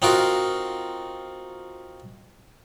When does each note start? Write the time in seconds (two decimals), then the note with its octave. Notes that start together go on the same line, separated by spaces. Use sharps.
0.02 C4 D#4 F4 F#4 A#4